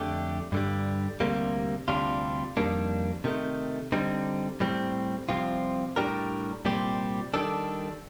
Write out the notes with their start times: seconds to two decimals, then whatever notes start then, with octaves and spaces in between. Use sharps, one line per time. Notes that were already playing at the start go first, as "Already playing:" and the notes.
Already playing: F2 D3 A3 D4 G4
0.52 G2 D3 G3
1.20 D2 C3 G3 A#3
1.88 D2 C3 G3 D4 F4
2.57 F2 D#3 G3 A#3 D4
3.24 C3 D#3 A3
3.92 D3 G3 C4 D#4
4.60 A2 G3 C4
5.29 C2 C3 F3 C4 F4
5.96 A2 G3 D4 G4 A#4
6.65 C2 A#2 G3 C4 G4
7.34 D#3 G3 D4 A4